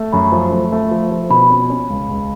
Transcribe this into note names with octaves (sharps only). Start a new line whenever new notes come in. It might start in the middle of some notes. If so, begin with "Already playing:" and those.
Already playing: A3
F#2 B5
F3
A3
A3
F3
F3
B2 B5
C#4
C#4
C#2
C#2